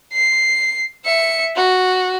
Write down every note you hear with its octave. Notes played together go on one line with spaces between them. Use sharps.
C7
E5 C#7
F#4